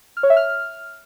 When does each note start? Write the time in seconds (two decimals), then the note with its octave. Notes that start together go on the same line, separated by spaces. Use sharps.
0.17 F6
0.23 C#5
0.30 E5
0.36 F6